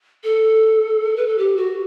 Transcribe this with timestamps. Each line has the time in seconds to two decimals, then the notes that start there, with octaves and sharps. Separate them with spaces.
0.24 A4
1.16 B4
1.27 A4
1.38 G4
1.57 F#4